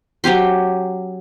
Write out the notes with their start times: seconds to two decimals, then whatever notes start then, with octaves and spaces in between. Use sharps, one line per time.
0.24 F#3 C#4 G4 C6